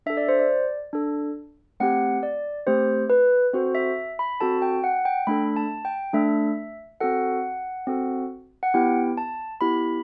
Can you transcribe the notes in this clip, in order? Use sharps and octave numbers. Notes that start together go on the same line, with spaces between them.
D4 A4 E5
D5
C5
D5
D4 A4
A3 C4 G4 F#5
D5
A3 C4 G4 C5
B4
C4 F#4 A4 C5
E5
B5
C4 F#4 A4 A5
G5
F#5
G5
A3 D4 A4 B5
A5
G5
A3 D4 A4 E5
C4 F#4 A4 F#5
C4 F#4 A4
F#5
B3 E4 G4 G5
A5
B3 E4 G4 B5